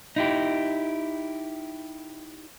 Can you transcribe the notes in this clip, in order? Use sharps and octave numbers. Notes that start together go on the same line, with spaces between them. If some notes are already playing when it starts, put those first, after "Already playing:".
D#4 E4 G4